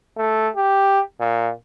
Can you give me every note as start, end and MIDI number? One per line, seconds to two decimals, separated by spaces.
0.17 0.48 57
0.56 1.00 67
1.20 1.51 46